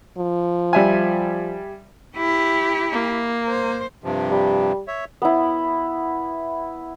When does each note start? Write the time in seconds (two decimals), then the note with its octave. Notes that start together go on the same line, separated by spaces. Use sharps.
0.18 F3
0.73 G3 E5 G#5
2.17 E4 G4
2.92 A#3
3.48 C5
4.04 G2 C3 F3
4.31 G3
4.88 C#5 E5
5.22 B3 E4